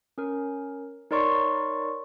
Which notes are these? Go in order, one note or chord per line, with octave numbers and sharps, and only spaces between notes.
C#4 A#4
D#4 A#4 C#5 D5 C6 C#6